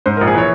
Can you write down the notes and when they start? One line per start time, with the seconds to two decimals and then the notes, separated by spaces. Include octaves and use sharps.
0.06 G#2 C5
0.17 A#1 A#4
0.28 G#4
0.35 E3 C#5